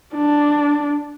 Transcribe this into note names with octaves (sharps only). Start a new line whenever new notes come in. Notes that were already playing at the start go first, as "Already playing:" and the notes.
D4